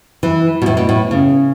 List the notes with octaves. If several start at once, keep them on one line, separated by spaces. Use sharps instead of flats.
E3
B2
A2
B2
A2
C#3